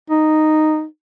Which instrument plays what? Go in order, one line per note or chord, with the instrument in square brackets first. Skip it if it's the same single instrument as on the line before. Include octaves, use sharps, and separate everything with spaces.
[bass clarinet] D#4